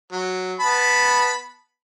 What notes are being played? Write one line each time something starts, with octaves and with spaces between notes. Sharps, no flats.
F#3
B3 A5 B5